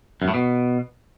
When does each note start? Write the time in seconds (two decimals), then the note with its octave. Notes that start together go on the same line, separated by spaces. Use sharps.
0.22 F#2
0.28 A2
0.34 B2